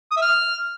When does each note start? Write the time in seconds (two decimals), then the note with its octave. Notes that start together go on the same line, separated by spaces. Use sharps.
0.11 D#6
0.17 E5
0.22 F6